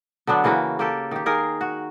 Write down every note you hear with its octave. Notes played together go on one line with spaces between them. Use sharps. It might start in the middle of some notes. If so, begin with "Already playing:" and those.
D3 F#3 B3 D4
C#3 E3 A#3 F#4
A#3 G4 A4
D#3 G4
D#3 G#4 A#4 F5
F#4